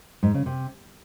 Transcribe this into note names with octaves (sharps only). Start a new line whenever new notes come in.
G#2
C#3
C3